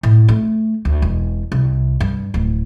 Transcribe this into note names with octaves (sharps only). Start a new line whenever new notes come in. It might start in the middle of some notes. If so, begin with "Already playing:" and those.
A2
A3
D2
E1
C2
G2
D1